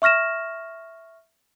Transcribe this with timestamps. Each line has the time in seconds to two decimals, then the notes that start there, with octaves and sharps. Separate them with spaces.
0.02 E5 C#6 F6 A#6 E7